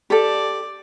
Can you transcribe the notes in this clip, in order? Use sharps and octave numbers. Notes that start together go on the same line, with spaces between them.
G4 A4 D5